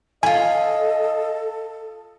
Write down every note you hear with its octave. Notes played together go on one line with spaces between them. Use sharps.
E4 F4 A4 D#5 G#5